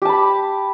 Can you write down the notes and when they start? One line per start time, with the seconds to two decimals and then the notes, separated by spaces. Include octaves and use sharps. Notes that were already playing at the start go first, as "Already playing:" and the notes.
0.02 G4
0.05 A5
0.09 B5